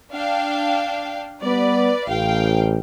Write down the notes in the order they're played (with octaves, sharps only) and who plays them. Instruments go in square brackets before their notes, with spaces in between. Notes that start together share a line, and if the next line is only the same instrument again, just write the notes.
[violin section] D4 F5 G5
[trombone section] G3 B3 [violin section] B4 D5
[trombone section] A1 [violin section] F5 G5